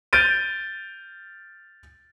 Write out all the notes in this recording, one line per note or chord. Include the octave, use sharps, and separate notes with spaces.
F6 G6 A6 D7 D#7